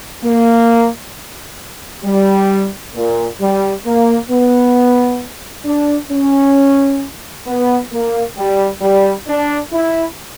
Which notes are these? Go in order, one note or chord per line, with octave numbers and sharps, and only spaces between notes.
A#3
G3
A#2
G3
A#3
B3
D4
C#4
B3
A#3
G3
G3
D4
E4